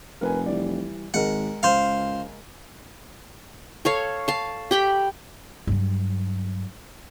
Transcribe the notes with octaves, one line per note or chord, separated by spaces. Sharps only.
F1 A#4 B4 G#5
E3 G3 D5
G#1 G#3 A#4 F#5
C#2 C5 F5
A4 C#5 F5
F5 A5
G4 G5 B5
G2 F#3